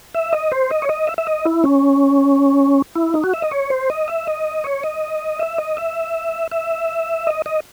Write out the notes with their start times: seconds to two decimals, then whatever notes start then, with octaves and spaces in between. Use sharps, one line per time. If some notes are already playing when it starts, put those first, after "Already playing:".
0.15 E5
0.33 D#5
0.52 C5
0.71 D#5
0.82 C#5
0.89 D#5
1.07 E5
1.18 E5
1.27 D#5
1.45 E4
1.64 C#4
2.95 E4
3.14 D#4
3.24 F#4
3.34 E5
3.42 D#5
3.51 C#5
3.70 C5
3.90 D#5
4.08 E5
4.27 D#5
4.64 C#5
4.83 D#5
5.39 E5
5.58 D#5
5.77 E5
6.51 E5
7.27 D#5
7.46 D#5